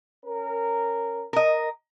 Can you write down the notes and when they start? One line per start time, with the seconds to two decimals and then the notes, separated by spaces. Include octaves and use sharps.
0.25 C#4 A#4
1.33 A#4 D#5